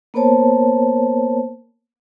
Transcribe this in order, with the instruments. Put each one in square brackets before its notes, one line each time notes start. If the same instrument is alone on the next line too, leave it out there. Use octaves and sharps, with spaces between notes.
[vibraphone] A#3 B3 A#4 C5 C#5 A5